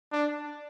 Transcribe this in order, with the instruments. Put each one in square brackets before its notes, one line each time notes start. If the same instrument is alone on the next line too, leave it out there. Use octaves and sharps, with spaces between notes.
[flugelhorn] D4